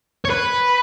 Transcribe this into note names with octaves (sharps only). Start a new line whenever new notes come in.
C#5
B4